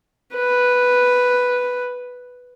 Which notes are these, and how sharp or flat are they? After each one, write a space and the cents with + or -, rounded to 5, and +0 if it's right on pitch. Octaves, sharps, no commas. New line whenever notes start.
B4 +0